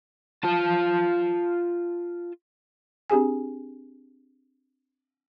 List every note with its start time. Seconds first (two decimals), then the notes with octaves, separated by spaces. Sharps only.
0.44 F4 A5
3.10 C4 D4 G4 G#4 G#5